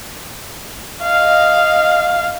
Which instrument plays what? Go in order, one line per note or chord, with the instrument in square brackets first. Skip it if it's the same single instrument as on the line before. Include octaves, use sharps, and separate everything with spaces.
[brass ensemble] D#5 [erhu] F5